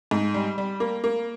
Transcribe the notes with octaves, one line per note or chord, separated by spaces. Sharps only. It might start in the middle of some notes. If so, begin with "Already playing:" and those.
G#2
G3
G3
A#3
A#3